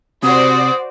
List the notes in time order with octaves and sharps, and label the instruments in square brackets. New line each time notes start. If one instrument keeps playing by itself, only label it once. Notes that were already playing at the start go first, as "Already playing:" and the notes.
[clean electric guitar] C3 [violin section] F#4 C5 D5 [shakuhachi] D#6